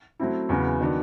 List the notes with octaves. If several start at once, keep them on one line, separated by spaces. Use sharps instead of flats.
F#3 A3 C4 E4
E2 C#3 F#3 B3
D#3 F#3 B3 D4